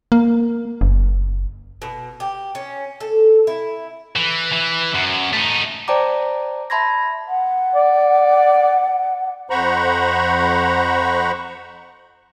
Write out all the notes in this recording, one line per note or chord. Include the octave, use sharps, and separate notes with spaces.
A#3
F#1
B2
G4
C#4
A4
E4
E3
E3
F#2
A3 D#4
C5 D5 G5 A5 A#5 D6
E5 A5 B5 C6 G#6 A#6
F#5
D5
F2 C5 F#5 A#5 B5 C#6